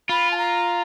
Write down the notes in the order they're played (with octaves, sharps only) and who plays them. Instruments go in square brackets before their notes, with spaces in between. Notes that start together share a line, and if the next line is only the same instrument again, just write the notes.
[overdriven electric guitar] F4 [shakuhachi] B5
[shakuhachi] A5
A#5